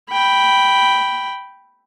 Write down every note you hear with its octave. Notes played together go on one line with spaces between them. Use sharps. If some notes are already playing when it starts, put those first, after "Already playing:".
G5 B5